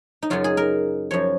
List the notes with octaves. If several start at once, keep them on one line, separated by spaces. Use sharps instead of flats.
D#4
F#2 C#3 F#3 F4
G#4
A#4
F#2 F3 C#5